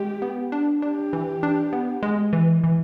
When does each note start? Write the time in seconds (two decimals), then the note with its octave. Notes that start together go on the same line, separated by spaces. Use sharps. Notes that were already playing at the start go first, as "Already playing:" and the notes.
Already playing: G#3 G4
0.22 B3
0.52 D4
0.82 D4 G4
1.13 E3
1.43 D4
1.73 B3
2.03 G#3
2.33 E3
2.64 E3